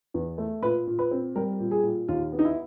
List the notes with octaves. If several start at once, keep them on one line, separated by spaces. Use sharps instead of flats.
E2
A3
A#2 B4
A#2
B4
C4
G3 A#4
A#2
G#4
A#2
D#2 F4
B3
D#4
E4